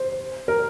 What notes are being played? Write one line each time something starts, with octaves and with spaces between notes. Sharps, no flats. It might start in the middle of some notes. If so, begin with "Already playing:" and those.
Already playing: C5
A#4